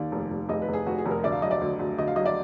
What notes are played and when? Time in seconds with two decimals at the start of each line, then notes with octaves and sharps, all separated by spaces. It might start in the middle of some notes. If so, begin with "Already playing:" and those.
Already playing: D#2 D#3 D5
0.12 F1
0.30 F1
0.49 F1 D#5
0.62 B4
0.68 F1
0.73 G#4
0.86 F1 F#4
0.98 G#4
1.06 F1 A#4
1.23 D2 D5
1.32 F5
1.42 F#3 D#5
1.51 D5
1.61 D2
1.79 D2
1.98 D2 D#5
2.07 F5
2.16 F#3 D#5
2.26 D5